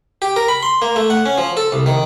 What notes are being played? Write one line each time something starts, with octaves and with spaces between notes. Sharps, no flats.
G4
A#4
B5
C6
A#3
A3
F#5
C#4
F3
A4
C2
D#3